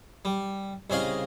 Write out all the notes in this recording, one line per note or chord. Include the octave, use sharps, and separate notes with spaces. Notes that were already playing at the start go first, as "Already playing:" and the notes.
G3
C2 C#3 G#4 D#5 F5